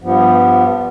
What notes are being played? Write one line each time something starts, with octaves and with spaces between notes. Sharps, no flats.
G2 F3 B3